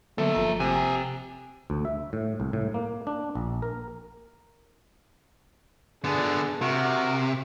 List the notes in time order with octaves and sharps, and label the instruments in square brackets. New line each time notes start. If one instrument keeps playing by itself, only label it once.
[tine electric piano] D3 F#3 B3 [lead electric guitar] A#3 E5 [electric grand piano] A4
[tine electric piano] G1 F3 A#5
[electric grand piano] C3 [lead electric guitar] G4 G#5
[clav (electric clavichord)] D2
E5
A2
C2
A2
A#3
D4
A#1
A#4
[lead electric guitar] D3 B3 [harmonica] D4 G#4
[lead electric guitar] C3 [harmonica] F#4 A#4